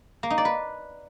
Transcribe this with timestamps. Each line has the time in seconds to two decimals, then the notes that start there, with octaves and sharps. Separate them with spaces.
0.23 A#3
0.30 D#4
0.38 D5
0.45 B4